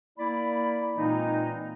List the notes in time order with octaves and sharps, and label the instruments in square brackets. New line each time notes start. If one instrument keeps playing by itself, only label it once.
[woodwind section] A#3 E4 D5 B5
A#2 E3 G#3 A#3 C4 D#4